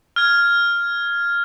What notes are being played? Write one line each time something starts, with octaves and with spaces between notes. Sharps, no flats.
F6 G#6